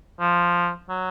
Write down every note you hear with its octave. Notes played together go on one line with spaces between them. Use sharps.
F3
F#3